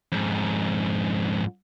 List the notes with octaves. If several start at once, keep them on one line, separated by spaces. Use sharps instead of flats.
F2 G#2